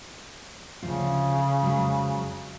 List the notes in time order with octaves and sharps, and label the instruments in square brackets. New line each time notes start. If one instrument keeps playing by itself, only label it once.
[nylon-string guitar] D2 F3 F4 [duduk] C#3
[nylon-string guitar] F2 F#3 G#3